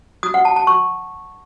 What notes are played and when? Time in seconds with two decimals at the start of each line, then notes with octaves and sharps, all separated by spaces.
0.23 D#6
0.34 F#5
0.45 A5
0.56 A5
0.67 C#6